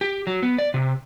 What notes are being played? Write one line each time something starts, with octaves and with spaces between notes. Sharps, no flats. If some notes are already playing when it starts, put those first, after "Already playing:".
G4
F#3
B3
D5
C3